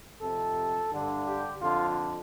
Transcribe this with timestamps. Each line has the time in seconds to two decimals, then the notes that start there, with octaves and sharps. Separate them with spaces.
0.21 F2 C3 A4
0.92 G2 D3
1.27 G4
1.62 F2 D3 F4